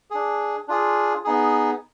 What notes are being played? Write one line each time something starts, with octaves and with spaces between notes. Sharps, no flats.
D4 G#4
D4 F4 G#4
B3 D#4 G#4